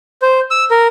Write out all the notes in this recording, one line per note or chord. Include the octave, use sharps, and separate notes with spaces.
C5
E6
A#4